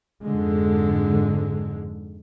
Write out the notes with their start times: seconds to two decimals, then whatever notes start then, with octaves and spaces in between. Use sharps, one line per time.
0.25 F2 G#2 D3 G#3